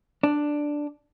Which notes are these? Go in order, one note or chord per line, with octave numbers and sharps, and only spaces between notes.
D4